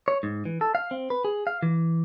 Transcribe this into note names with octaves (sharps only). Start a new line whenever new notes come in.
C#5
G#2
E3
A4
F5
C4
B4
G#4
F5
E3